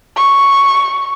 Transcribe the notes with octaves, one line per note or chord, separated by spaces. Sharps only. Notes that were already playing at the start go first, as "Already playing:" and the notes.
C#6